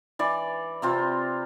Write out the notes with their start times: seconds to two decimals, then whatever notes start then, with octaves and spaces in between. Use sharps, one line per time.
0.19 E3 D5
0.82 C3 C4 F4